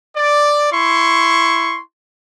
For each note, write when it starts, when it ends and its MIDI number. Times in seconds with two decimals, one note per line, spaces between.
0.16 0.70 74
0.72 1.80 64
0.72 1.80 84
0.72 1.80 85